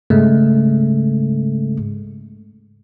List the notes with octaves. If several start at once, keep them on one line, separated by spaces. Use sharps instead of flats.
G#2 C#3 G#3 A3